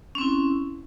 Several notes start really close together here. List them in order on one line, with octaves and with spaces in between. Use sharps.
C#4 C4 E4